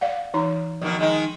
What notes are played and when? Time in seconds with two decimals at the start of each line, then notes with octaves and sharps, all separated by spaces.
0.01 D5 F5 F#5
0.34 E3 D#4 A#5
0.82 B2 D#3 F3 A#3
0.99 D#3 G#3 D#4